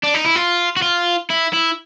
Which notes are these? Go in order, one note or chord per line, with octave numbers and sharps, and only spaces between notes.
D4
D#4
E4
F4
F#4
F4
E4
E4